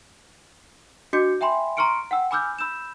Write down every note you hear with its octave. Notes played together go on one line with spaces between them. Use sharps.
D4 F#4 D#5 D6 G6 C#7
E5 G5 G#5 B5 C6
A#5 C6 C#6 F6 C#7 D7
F#5 G5 E6
G#5 B5 D6 E6 F6 G6
B5 E6 G6 E7